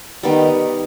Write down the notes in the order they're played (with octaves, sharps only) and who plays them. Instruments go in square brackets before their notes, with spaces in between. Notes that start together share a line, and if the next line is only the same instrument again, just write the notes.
[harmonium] D#3 [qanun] G3 B3 D#4 G4